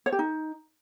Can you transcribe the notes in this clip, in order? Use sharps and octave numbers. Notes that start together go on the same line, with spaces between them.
C#5
G4
D#4